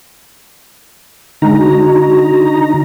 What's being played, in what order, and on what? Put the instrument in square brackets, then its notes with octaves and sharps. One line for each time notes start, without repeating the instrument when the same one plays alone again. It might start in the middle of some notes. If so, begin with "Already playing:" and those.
[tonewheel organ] D3 D#4 A#5 [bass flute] G#3
[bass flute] F#4